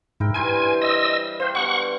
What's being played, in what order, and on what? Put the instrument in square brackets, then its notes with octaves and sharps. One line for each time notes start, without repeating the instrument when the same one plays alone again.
[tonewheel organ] G#2 [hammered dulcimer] E4 A#4 G5
[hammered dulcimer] G2 E3 C5 [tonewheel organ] G#5
[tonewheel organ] D#5 E6
[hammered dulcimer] F4 G4 [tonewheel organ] C5
[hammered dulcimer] B2 B3 D4 [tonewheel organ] F#5 C#6